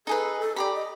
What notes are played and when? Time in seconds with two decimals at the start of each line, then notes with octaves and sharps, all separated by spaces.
0.07 D#4 G#4 A4 B4
0.40 A4
0.56 G4 D5 A#5 B5
0.74 D#5